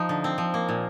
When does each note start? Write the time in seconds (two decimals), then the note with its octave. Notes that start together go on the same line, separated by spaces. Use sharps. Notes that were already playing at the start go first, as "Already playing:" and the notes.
Already playing: F3 D#4
0.09 D3
0.24 C4
0.38 F3
0.54 A#3
0.69 A#2